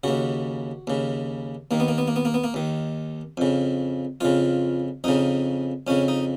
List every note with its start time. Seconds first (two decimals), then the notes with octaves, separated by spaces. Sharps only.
0.04 D#2 C#3 F#4
0.87 D#2 C#3
1.71 D#2 D#3 A#3
1.80 B3
1.88 A#3
1.98 B3
2.08 A#3
2.16 B3
2.25 A#3
2.34 B3
2.44 A#3
2.54 D#2 D#3
3.37 F2 C#3
4.21 F2 C#3 F4
5.04 F2 C#3 D#4
5.87 F2 C#3 C#4
6.08 D#4